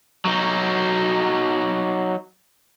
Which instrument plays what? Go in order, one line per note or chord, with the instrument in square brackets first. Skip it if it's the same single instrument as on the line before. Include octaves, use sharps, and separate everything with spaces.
[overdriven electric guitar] F#3 D#4